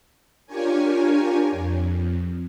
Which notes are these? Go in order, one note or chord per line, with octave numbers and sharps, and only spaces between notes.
D4 F4 G4 A#4 C#5 G#5
F2